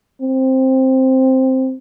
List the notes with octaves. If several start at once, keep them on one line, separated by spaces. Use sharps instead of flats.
C4